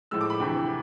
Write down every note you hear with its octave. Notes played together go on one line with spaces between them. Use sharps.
A2 F3 G#3 E6
D6
B5
D2 C3 E3